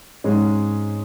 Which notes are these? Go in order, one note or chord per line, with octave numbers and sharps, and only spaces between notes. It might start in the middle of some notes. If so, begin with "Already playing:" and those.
G#2 G#3 C#4